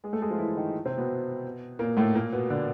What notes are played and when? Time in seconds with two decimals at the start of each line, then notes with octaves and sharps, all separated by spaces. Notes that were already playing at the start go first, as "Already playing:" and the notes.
0.04 G#3 G#4
0.13 A3 A4
0.22 G#3 G#4
0.30 F3 F4
0.39 E3 E4
0.57 D#3 D#4
0.85 C3 C4
0.98 B2 B3
1.79 A#2 A#3
1.97 A2 A3
2.14 A#2 A#3
2.33 B2 B3
2.50 D3 D4